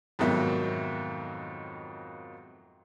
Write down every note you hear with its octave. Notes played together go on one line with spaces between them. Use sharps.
F2 G#2 B2 D#3 F#3 E5